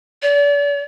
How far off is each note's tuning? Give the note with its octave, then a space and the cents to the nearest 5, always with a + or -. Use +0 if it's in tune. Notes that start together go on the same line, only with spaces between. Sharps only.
D5 -40